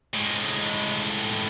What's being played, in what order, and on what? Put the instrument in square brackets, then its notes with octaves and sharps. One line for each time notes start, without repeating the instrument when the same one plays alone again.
[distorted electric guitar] A2 G#3